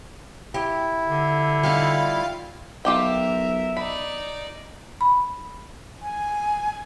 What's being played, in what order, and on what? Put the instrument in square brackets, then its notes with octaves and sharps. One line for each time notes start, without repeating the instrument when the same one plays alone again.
[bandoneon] E4 [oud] G4
[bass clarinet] D3
[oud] G3 D#4 [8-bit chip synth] F4 F5
[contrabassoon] B1 [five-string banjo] F4 G4 G5 [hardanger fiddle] A#4 [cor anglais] E5
[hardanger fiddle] D#4 D5 [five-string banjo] B5
[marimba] B5
[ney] G#5